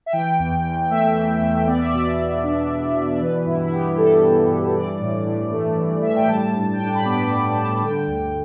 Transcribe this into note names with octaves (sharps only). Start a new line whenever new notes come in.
E5
E3 G5
E2
E2
A3 E5
E3
E2
B3 D5
E5
B2 D5
B2
D4
B3
B2
E3 B4
G2 E4
E4
B3 G4
G3 A4
E3
G2
E3 D5
A2
A2
A3
E3
A2 E5
G5
G3 A5
G2
G5
D4 A5
B5
B3 D6
D6
G3 B5
G2 A5
D3 G5
D2